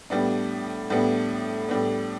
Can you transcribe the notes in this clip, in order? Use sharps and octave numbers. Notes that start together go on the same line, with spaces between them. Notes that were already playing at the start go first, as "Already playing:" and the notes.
A2 G3 B3 D4
A2 G3 B3 D4
A2 G3 B3 D4